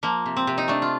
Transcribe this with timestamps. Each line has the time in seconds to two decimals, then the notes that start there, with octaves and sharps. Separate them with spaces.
0.03 F3 A#3
0.26 C3
0.37 C4
0.47 C3
0.58 D#4
0.68 A3 D4
0.82 F4